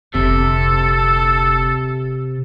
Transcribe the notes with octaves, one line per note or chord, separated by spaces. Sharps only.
F1 D2 C3 A4